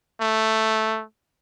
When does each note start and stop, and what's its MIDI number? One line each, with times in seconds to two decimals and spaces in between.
0.21 1.03 57